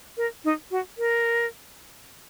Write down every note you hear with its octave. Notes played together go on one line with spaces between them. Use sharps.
A#4
D#4
F#4
A#4